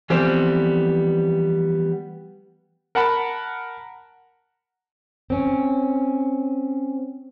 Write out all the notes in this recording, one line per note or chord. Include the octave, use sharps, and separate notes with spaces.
E3 F3 G3 A3 B3 C4
A#4 F#5 A5 B5
C4 C#4